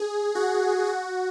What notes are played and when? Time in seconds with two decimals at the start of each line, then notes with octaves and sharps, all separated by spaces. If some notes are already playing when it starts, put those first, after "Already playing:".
Already playing: G#4
0.35 F#4
0.87 F#4